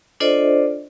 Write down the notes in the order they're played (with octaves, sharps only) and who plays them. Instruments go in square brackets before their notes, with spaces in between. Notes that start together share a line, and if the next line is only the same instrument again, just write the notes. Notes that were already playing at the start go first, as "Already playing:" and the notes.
[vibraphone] D4 F4 A4 C5 D5 D#5